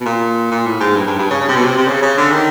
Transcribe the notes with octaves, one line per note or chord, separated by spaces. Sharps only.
B2
A#2
A#2
A2
G#2
G2
G2
G2
C#3
C#3
C3
B2
C3
C3
C#3
C#3
D3
D#3